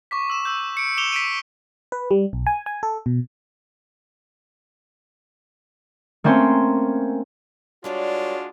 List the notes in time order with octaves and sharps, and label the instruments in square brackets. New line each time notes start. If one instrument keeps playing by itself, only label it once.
[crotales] C#6 D6 B6
E6 E7
E6 G6
C#7 D7
D6 C#7 E7 F7 G7
B6 D7 D#7
[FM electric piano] B4
G3
B1
G#5
G#5
A4
B2
[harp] A3 A#3 C4 C#4 C6
[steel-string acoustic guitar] G3 A#4 D5 [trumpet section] G#3 D4 F4 [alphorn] F#4 [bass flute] C#5